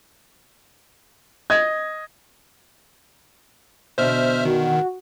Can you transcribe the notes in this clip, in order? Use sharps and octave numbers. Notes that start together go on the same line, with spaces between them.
D#5 G#6
E2 B2 D3 C5 E5 F6
D#3 F#4